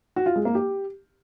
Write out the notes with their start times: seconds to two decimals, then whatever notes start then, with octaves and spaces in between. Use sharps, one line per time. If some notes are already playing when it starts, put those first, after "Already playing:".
0.16 F#4
0.26 F4
0.36 G#3
0.45 A#3
0.55 G4